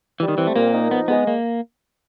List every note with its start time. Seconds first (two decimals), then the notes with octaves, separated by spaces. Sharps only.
0.20 E3 G3
0.28 D#3
0.38 E3 C4
0.47 A3
0.55 A#2 A#3
0.73 D#4
0.91 F3 B3
1.08 G#3 B3
1.27 A#3